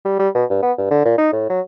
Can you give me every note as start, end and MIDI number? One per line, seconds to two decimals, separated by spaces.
0.05 0.17 55
0.19 0.28 55
0.35 0.44 47
0.50 0.58 43
0.62 0.72 59
0.78 0.87 43
0.91 1.04 50
1.05 1.13 46
1.18 1.31 63
1.32 1.45 45
1.49 1.60 54